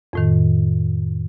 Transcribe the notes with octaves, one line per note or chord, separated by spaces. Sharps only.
F2 A2 D#3